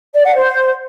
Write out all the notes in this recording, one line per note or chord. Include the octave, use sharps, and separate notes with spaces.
D5
F#5
C5